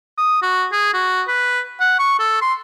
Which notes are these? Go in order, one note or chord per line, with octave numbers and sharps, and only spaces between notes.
D#6
F#4
G#4
F#4
B4
F#5
C#6
A4
C6